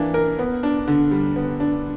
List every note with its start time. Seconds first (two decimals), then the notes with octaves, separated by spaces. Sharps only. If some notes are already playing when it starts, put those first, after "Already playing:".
Already playing: E3 A#3 D4
0.14 A#4
0.39 B3
0.63 D4
0.88 D3
1.11 G3
1.36 B3
1.60 D4